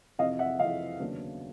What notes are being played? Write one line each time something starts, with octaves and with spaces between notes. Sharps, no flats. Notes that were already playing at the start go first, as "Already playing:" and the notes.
F2 C3 E3 D#5 F5
E5 F#5
F2 C3 E3 D#5 F5
D#2 C#3 F#3 B3 D4